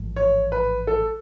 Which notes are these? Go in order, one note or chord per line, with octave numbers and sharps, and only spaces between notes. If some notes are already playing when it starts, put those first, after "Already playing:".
Already playing: A1 G#2 F3
C#5
B4
A4